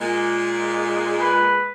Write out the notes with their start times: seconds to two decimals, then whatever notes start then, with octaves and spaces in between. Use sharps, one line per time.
0.01 A#2 G#3
1.20 B4